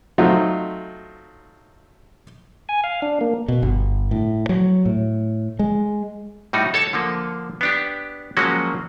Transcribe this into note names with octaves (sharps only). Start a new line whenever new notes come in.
F#3 A3 C4 D#4 F4
G#5
F5
D4
A#3
B2
G1
A2
F#3
A2
G#3
A2 G3 D#4 F#4
A4 C#5 A5
D3 F3 A#3
B3 D4 G4
F3 F#3 G#3 A#3 C#4 F#4